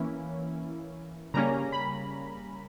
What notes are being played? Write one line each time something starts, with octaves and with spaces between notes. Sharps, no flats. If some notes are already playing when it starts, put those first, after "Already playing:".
Already playing: E3 A#3 C#4 E4
C#3 G3 A#3 C#4 A#5
B5